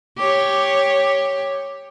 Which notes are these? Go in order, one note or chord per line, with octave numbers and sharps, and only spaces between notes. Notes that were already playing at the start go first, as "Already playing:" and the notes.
G4 C#5